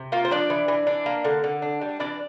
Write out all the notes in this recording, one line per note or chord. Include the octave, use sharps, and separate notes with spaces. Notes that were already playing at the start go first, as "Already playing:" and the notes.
Already playing: C3
A#3 F4
C5
F3 D4 D5
E3
E3
D4
A#3
D3
D3
D4
G3
E3 D4 D5